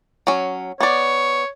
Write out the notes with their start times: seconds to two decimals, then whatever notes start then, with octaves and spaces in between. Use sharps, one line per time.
0.27 F#3 C#4
0.81 B3 C#5 D5